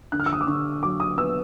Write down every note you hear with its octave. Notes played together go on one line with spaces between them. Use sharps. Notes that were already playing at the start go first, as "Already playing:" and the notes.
D3 F#6
F6
E6
D#6
D6
D3 C#6
F#3 D6
D#6
B3 E6